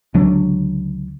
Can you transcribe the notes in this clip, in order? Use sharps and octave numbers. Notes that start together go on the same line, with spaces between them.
C#2 D3 F#3 D4